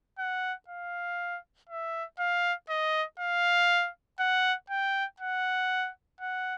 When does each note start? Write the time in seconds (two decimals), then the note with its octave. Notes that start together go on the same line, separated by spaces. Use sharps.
0.18 F#5
0.68 F5
1.69 E5
2.19 F5
2.69 D#5
3.19 F5
4.20 F#5
4.70 G5
5.20 F#5
6.20 F#5